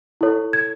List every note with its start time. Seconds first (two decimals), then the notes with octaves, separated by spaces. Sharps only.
0.21 E4 A4 C#5
0.53 G#6